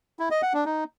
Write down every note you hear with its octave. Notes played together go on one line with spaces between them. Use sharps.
E4
D#5
F#5
D4
D#4